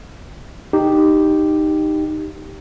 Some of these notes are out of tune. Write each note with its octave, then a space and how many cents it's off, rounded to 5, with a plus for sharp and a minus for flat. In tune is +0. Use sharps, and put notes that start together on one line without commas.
D#4 -10 G4 +0